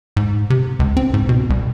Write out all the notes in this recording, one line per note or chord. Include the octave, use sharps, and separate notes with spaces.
G#2
C3
C#2
C4
G#2
B2
C2